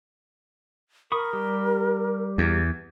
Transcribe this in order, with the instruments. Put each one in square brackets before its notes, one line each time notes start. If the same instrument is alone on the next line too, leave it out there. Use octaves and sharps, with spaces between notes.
[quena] A#4 [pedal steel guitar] B5 C#6 D#6
[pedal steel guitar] G3 G4
[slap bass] E2